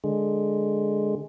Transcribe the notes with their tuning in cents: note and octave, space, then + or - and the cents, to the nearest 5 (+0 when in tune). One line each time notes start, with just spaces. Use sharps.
D3 +10 G#3 +0